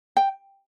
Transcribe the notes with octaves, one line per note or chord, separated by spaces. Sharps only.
G5